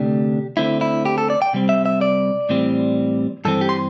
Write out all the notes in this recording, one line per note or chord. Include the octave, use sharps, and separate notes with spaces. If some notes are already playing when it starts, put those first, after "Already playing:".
Already playing: D2 C3 A3 D4 G4
D2 D3 C4 E4
E4
G4
A4
D5
G5
C3 G3 C4
E5
E5
D5
A2 E3 G3 C4
G2 E3 C4 A4
G4
C6